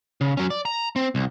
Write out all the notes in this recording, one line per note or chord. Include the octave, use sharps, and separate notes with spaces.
C#3
F#3 C#4
D5
A#5
C4
C2